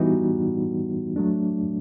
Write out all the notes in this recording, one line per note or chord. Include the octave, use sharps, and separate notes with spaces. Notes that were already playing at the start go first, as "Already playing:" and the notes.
Already playing: E3 G3 B3 D#4 F#4
F#3 A3 D4